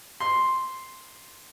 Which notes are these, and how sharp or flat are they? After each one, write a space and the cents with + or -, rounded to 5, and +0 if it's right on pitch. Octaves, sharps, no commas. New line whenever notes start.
C6 +0